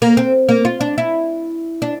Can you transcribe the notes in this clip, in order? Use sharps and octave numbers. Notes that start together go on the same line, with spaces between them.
A#3
C4
A#3
F4
D4
E4
D4